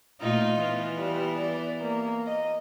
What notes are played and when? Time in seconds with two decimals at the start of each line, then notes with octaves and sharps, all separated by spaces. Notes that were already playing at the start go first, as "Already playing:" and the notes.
0.21 A#2 A3 D#4 F4
0.55 E3 B3
0.98 G3
1.38 D5
1.81 A#3
2.27 D#5